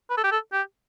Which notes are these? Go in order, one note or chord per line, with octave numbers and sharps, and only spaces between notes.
B4
A4
G4
A4
G4